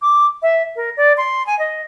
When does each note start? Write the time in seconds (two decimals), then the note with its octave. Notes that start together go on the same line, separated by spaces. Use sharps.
0.01 D6
0.42 E5
0.76 A#4
0.96 D5
1.17 C6
1.46 G#5
1.59 D#5